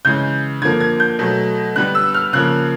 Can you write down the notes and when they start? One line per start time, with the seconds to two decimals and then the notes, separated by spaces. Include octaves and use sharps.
0.05 C#3 E3 G#3 G6
0.62 D3 F3 A#3 G#6
0.81 G#6
1.00 G6
1.19 B2 F#3 A3
1.76 D3 G3 B3 F#6
1.95 E6
2.14 F6
2.33 C#3 F3 A#3 F#6